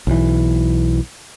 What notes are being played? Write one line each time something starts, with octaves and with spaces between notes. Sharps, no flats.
B1 E3